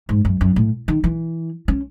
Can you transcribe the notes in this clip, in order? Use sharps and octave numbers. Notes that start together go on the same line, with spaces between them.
G#2
F#2
F#2
A2
D#3
E3
C#4